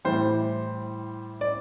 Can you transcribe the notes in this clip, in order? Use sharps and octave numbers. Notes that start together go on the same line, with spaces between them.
A2 E3 G3 C5
D5